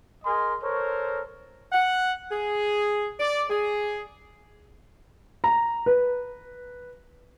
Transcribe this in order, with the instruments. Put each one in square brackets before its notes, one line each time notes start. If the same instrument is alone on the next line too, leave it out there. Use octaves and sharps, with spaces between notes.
[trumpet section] G#4 A#4 D#5 G#5 C6
A4 A#4 C5 C#5
[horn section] F#5
G#4
D5
G#4
[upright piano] A#5
B4